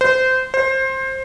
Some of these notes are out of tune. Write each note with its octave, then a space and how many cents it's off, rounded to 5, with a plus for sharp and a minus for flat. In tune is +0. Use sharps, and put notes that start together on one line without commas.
C5 -20
C5 +20